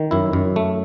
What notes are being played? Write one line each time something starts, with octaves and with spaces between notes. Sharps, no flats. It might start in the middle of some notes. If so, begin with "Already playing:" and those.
Already playing: D#3
F#2 E4
F#2
A3